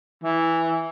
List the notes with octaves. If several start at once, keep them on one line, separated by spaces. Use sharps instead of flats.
E3